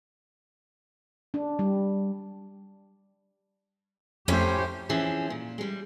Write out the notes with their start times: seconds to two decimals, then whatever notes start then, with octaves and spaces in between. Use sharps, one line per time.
1.34 D4
1.59 G3
4.28 F2 A2 A3 C#4 G4 C5
4.89 E3 F3 C4 C#4 E4 G#4
5.30 A#2
5.58 G3 G#3